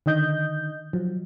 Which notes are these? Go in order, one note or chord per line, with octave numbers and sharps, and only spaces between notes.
D3 D#3 D#5 G6
F3 F#3